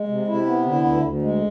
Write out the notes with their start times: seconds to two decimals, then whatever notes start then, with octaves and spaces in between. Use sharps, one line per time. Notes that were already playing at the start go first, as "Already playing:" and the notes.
Already playing: G#3
0.08 C3
0.28 C3 E4
0.47 B3
0.65 D3 E4
0.84 D2
1.03 D2
1.22 G#3